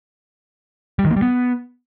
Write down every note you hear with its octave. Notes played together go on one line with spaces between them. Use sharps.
G3
D#3
A#3
G3
B3